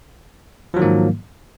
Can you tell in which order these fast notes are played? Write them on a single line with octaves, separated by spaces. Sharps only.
F3 F#3 D#3 A#3 G#2